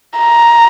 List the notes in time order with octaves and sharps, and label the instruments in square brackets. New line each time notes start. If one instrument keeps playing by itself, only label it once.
[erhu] A#5